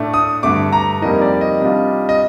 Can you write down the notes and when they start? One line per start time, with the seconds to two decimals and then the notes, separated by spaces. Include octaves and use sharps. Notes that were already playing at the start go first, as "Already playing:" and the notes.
Already playing: A2 A3 D4
0.14 D#6
0.43 G2 D3 A3 D6
0.73 A#5
1.02 F2 C3 G3 A#3 D#4 D#5
1.21 D5
1.41 D#5
1.60 C3 G3 D4 F4
2.09 D#5